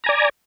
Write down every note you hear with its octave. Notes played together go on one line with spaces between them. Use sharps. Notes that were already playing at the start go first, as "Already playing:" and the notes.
D5 G#5 A#5